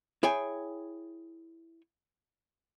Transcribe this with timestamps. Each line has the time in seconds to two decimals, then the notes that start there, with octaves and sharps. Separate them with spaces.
0.23 E4 G#4 C#5 G5 G#5